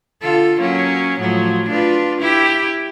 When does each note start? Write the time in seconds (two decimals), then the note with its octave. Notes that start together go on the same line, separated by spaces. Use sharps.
0.22 D3 F4 A4
0.61 F#3 A#3 C#4
1.20 A2 F3 F#3
1.69 D4 F4 B4
2.21 E4 G4